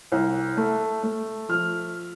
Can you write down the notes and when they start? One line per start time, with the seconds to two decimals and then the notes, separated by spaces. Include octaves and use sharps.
0.12 C2
0.57 A3
1.03 A3
1.49 F3 F6